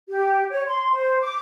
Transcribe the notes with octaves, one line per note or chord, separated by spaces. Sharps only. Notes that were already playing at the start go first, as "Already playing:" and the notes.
G4
C#5
C6
C5
D6